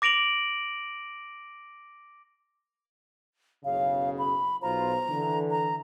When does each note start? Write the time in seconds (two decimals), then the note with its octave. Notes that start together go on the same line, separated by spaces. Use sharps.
0.02 D6 A#6 D7 F7 F#7
3.65 F#1 B1 C#3 F5
4.18 B5
4.62 B1 F4 C5 A#5
5.09 D3 E3
5.50 A#5